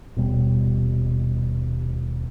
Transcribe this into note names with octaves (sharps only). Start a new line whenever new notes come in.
D#1 B2 G3